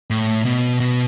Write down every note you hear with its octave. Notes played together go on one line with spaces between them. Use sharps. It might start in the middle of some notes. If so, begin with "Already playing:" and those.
A2
B2
B2